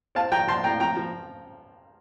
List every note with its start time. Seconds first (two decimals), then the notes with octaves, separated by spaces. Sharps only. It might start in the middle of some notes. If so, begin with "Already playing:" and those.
0.15 C4 F5 A5
0.32 F3 G5 A#5
0.47 F3 A5 C6
0.64 A2 G5 A#5
0.80 F3 G5 A#5
0.97 F3